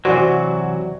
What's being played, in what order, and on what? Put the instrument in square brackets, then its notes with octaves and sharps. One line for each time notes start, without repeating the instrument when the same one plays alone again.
[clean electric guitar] C3 E3 F#3 [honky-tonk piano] F#4 [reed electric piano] C5 D5